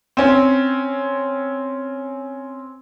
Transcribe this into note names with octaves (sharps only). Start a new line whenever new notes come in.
C4 C#4